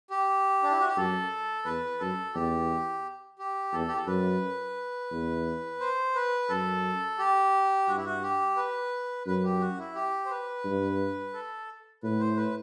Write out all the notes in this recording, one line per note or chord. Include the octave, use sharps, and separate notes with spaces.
G4
D4
E4
F#4
G4
F#2 A4
E2 B4
F#2 A4
E2 G4
G4
E2 A4
G4
A4
F#2 B4
E2
C5
B4
F#2 A4
G4
G2 F#4
E4
F#4
G4
B4
F#2 B4
G4
F#4
E4
G4
C5
B4
G2
A4
A2 B4
C5
B4